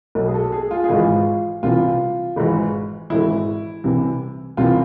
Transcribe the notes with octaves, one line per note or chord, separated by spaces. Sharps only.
B1 B2
G#4
A4
G#4
F4
G#4
G#1 G#2 E3 F4
C2 C3 E3 F4
G#1 G#2 E3
G#1 G#2 E3 E4
C2 C3 E3
C2 C3 E3 F4